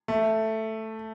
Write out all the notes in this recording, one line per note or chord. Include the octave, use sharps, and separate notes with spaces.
A3